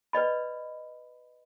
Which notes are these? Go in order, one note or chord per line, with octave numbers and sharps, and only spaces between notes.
B4 D5 D#5 B5